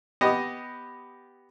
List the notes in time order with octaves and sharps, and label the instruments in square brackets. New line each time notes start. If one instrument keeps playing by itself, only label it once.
[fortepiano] B3 G4 D#5